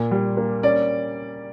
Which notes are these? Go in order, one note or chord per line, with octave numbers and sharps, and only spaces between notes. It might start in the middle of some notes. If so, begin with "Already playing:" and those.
Already playing: A#2 A#3
G3
A#3
C#4 D5